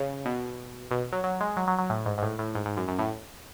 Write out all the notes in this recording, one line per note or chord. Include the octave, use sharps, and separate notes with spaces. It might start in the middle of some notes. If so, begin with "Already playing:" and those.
Already playing: C#3
B2
B2
F#3
F#3
G#3
F#3
F#3
F#3
A2
G#2
G#2
A2
A2
G#2
G#2
F#2
F#2
A2